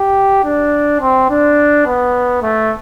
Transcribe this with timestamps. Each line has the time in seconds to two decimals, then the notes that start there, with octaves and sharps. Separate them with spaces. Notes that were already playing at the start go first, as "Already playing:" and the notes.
Already playing: G4
0.44 D4
1.01 C4
1.30 D4
1.86 B3
2.42 A3